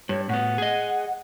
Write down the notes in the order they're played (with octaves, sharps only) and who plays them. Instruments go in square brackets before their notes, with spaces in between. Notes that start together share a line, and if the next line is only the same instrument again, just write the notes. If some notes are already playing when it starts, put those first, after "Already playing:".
[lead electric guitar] G2 [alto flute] C#5
[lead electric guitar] A2 B3 [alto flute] F#5
[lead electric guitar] G#4 D#5